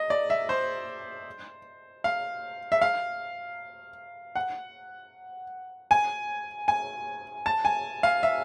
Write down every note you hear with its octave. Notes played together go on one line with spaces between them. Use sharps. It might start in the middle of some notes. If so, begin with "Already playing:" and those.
Already playing: D#5
D5
E5
C5
F5
E5
F5
F#5
G#5
G#5
A5
G#5
F5
E5